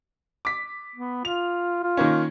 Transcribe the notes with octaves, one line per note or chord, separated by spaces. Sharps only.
D6 B6
B3
F4 F7
F4
D#3 A#3 C#4